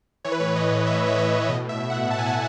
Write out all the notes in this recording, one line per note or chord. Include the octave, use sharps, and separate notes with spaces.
E3 C#5
B4
A2 C#5
E3 D#5
A2
E3 E5
A2 C#5
E3 D#5
A2
B2 D#5
B2 E5
B2
F#5
B2
B2 A5
G#5
B2 F#5